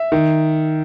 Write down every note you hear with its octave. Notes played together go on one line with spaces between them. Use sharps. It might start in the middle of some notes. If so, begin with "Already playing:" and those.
Already playing: E5
D#3